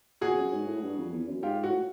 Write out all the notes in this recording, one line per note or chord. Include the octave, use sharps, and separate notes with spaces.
A#2 F#4 G#4
F2
F#2
G#2
A2
G2
F2
E2
F#2
G#2 F4 G4
A2 F#4